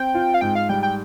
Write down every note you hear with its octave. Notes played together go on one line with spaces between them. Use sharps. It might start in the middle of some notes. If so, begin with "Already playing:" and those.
Already playing: C4 G5
F4
F5
G#2 G5
F5
G3 G5
G5